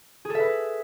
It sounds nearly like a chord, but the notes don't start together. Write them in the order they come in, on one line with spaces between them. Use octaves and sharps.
G#4 A4 E5 B4